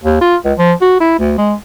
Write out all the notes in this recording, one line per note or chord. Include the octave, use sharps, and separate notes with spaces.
D#2
F4
C#2
F3
F#4
E4
D2
G#3